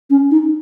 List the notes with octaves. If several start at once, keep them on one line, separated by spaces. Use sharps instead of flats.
C#4
D#4